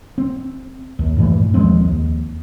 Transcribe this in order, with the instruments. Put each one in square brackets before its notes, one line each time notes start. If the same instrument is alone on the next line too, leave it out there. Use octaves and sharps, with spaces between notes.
[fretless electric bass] C4
D#2
G2 A#2 E3 A3
D#2 F3 G#3 C4
D#2